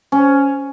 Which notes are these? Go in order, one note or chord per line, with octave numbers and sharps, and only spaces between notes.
C#4